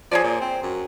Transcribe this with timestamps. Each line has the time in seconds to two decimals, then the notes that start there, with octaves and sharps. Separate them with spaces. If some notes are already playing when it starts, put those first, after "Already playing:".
0.11 F3 G#4 C#5 D5
0.24 A#2
0.41 C4
0.62 F#2